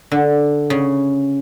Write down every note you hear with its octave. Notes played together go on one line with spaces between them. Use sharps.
D3
C#3